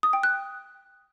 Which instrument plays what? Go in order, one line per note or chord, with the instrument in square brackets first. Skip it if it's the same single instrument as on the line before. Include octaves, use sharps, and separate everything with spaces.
[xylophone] D#6
G5
F#6